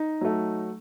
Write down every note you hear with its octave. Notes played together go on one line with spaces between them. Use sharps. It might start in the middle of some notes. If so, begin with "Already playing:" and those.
Already playing: D#4
F#3 A3